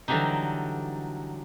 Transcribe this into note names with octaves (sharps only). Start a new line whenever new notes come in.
D3 E3 F#3 G3 D4 D#4